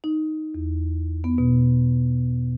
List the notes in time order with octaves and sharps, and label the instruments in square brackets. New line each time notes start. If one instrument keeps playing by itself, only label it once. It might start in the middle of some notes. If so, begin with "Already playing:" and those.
[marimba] D#4
E2
B3
B2